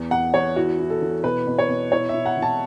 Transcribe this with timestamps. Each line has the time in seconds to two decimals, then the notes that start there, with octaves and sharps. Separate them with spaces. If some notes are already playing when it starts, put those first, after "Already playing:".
Already playing: E2
0.11 E2 F#5
0.34 E2 C#5
0.56 E4 F#4
0.79 E4
0.90 A4
1.02 E3
1.24 B2 B4
1.47 B2
1.59 C#5
1.69 B2
1.92 E4 C#5
2.09 E4 E5
2.26 F#5
2.37 E3
2.42 A5